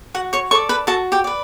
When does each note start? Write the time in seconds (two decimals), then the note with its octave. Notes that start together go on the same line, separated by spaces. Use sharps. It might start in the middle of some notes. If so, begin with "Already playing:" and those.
0.14 F#4 F#5
0.33 C#5 C#6
0.51 A4 C#5 D5 C#6
0.69 B4 B5
0.87 F#4 A4 A5
1.12 G4 G5
1.24 B4 D5